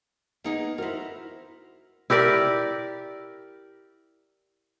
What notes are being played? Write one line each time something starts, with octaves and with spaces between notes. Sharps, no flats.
G#3 A#3 B3 D#4 G#4
E4 F#4 A#4 C5
E4 G4 A#4 D5